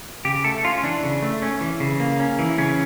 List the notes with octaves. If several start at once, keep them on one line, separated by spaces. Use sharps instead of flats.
C#3 G4
A3 A4
C#4 F4
E3 D4
C#3
A3
C#4
E3
C#3
A#3
C#4
E3
C#3 C#4